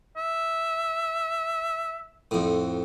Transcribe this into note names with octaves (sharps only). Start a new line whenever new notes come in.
E5
F2 A2